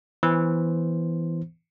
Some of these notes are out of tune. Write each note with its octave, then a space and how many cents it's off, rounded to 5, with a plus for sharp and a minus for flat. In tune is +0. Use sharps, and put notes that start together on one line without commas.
E3 +0 B3 +0 C5 +0